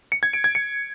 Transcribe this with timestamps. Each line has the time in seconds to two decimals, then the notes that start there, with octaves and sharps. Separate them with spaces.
0.12 C#7
0.23 G#6
0.33 D7
0.44 G#6
0.55 C#7